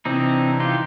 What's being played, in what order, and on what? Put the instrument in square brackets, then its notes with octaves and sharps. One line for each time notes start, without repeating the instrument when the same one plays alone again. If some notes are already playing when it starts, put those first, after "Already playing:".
[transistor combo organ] C3 E3 [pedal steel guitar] C4 D4 D#4
[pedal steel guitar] D#4 F4 G4